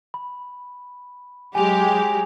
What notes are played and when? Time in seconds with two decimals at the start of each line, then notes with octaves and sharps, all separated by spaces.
0.14 B5
1.55 F#3 G#3 G4 G#5 F7